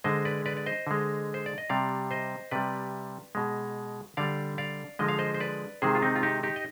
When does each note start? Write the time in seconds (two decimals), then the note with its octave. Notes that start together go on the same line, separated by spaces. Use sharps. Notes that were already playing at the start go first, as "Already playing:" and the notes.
0.04 D3 G#3 C5 D#5
0.25 B4 D5
0.46 B4 D5
0.57 D5
0.66 C5 D#5
0.87 D3 G#3
1.34 C5
1.46 D5
1.58 D#5
1.69 C3 G3 D5 F5
2.11 C5 D#5
2.51 C3 G3 B4 D5
3.35 B2 G#3
4.17 D3 G3 D5 F5
4.58 D5 F5
4.99 D3 F3 G#3 D#5
5.08 F5
5.19 C5 D#5
5.34 C5
5.40 B4 D5
5.82 C3 D#3 G#3 G#4 C5
5.95 F4
6.02 C4 D#4
6.16 F4
6.23 D#4 G4
6.43 D#4 G4
6.56 D#5